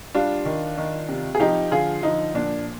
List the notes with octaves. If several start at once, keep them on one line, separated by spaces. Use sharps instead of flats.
G3 D4 F4
D#3
D#3
C3
G#4
F3 D#4 G4
D3 F4 G#4
F3 D#4
A#2 D4